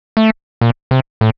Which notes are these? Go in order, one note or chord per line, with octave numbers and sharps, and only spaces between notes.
A3
A#2
C3
A2